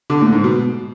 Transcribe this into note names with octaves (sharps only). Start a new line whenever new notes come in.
D3
A2
G#2
B2